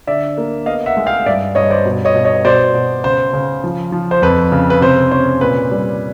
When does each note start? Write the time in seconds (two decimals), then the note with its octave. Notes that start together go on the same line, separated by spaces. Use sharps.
0.07 D3 D5 E5
0.38 A#3
0.66 B3 D#5 F5
0.86 E5 F#5
0.97 G#3
1.06 F5 G5
1.26 G2 D5 E5
1.55 G2 C#5 D#5
1.70 C5 D5
1.85 B2
2.05 C#5 D#5
2.15 B2
2.24 C#5 D#5
2.45 B2 C5 D5
2.74 B2
3.04 C#3 C5
3.33 C#3
3.64 F3
3.92 F3
4.11 C5
4.22 F2 B4
4.52 C#3
4.70 B4
4.81 C3 C5
5.11 C#4 C5
5.41 A#2 B4
5.71 G3